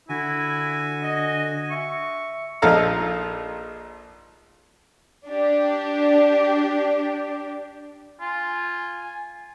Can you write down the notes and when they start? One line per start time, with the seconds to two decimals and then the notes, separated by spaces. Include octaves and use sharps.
0.09 D3 E4 F#4 G#5
1.03 D#5
1.71 E5 C#6
2.62 A#1 F3 D#4 A4 F5 A#5
5.28 D4 G4
8.21 F4 G#5